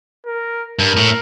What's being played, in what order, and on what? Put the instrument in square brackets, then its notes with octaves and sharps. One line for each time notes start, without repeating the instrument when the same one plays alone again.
[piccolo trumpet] A#4
[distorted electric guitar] G2 [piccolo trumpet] A#4
[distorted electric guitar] A2